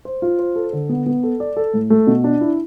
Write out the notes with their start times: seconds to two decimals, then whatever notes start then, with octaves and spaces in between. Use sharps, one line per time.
0.05 C5
0.22 F4
0.39 C5
0.56 A4
0.73 D3
0.89 B3
1.06 B3
1.23 A4
1.40 D5
1.57 A4
1.73 A2
1.90 A3
2.07 B2
2.24 D4
2.41 E4